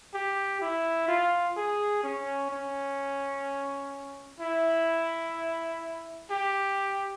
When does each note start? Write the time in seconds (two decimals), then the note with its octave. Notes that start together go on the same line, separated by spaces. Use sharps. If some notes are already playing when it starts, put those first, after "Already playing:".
0.14 G4
0.61 E4
1.08 F4
1.57 G#4
2.03 C#4
2.51 C#4
4.40 E4
6.30 G4